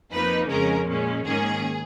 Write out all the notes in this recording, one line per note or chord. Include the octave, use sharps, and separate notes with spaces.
F2 F3 A#3 D#4 B4
F2 C#3 G#3 C#4 A#4
A#2 G#3 C#4
G#2 D#3 A#3 C#4 G#4